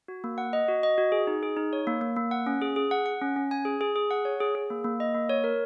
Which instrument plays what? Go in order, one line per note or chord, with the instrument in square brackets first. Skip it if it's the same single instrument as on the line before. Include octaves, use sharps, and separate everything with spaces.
[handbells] F#4
A#3
F#5
D#5
F#4
D#5
F#4
G#4
D#4
G#4
D#4
C#5
A#3
A#3
A#3
F#5
C#4
G#4
G#4
F#5
F#5
C#4
C#4
G#5
G#4
G#4
G#4
F#5
C#5
G#4
G#4
A#3
A#3
D#5
A#3
C#5
A#4